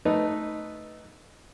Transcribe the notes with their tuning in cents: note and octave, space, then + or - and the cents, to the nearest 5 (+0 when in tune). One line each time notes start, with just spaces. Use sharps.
A3 +0 D#4 +0 B4 +0